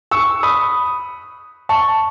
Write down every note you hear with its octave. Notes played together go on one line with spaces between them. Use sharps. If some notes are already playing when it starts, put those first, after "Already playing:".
C#6 E6
B5 D#6
A5 C#6